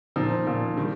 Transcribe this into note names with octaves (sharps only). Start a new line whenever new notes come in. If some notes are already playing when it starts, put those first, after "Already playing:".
A#2 F3 D#4
A#2 F3
D#3 G3